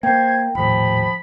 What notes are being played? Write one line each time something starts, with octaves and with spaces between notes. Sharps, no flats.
A#3 C5 G5 G#6
D#1 A2 F3 B5